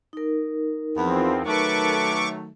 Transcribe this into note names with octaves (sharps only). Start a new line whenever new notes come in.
D#4 A#4
E2 F3 B3 C4
D#3 F#3 A3 A4 B4 C#6 D6